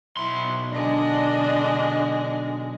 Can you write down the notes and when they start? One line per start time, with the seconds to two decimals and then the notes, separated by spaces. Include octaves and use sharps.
0.17 B1 E4 C6
0.71 D3 G#3 D4 D#5